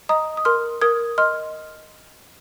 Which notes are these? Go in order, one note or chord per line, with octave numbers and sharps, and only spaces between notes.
D#5 A#5 D#6
D#6
A#4 C6 F6
A#4 D#6 G#6
D#5 C6 F6